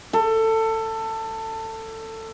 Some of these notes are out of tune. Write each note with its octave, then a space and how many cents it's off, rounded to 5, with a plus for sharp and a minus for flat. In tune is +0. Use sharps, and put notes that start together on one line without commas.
A4 +20